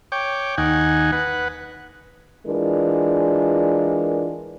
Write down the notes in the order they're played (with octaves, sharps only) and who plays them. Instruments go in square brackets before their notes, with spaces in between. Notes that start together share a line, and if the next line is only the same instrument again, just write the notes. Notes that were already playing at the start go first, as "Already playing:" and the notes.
[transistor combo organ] C#5 G5 D6
D#2 D#4 F#5 G#5
B4 F#5
[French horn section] E3 G#3 D4 F4 A#4